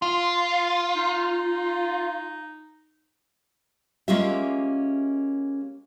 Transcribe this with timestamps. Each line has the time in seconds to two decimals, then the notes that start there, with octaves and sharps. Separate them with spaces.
0.02 F4 C6
0.96 D#4
4.08 G#3 A#3 C#4 F4 G4 E5